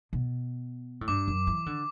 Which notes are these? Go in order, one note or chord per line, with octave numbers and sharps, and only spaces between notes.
B2
A2
G2 D6
F#2
E3
D3